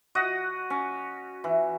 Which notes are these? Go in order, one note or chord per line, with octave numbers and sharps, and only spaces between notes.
F#4 D#5 F#5
C#4
E3